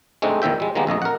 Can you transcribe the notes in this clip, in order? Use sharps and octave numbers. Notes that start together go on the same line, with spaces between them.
G#3 A3 C4 D4 D#4
E2 A#2 D#3 E5 G5
G3 G#3
D#3 G3 G#3 A#3 B3
A#1 F2 A3 D#5
A#4 F#5